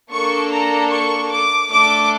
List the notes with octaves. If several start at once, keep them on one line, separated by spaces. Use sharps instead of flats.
A#3 D4 A4 C#6
A#5
C#6
D6
A3 D4 A4 D6